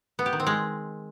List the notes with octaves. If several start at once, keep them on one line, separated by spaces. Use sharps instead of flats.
B3
G4
D#3
C4
G#3